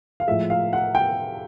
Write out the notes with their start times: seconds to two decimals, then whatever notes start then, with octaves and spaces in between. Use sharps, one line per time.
0.20 F5
0.27 A2 F3 G#3 E5
0.50 F5
0.73 F#5
0.95 G5